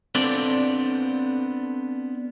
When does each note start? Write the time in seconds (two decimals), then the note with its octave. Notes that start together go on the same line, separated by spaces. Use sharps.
0.15 B3 C4 D4 F4 A4 D5